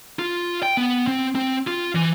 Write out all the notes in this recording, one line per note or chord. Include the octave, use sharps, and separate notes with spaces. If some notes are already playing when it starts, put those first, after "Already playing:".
F4
G5
B3
C4
C4
F4
E3